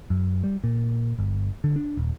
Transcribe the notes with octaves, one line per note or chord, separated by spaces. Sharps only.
F#2
G3
A#2
G1
D3
D4
D#1